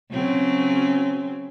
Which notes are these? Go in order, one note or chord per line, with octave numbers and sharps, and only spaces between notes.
C#3 F#3 C4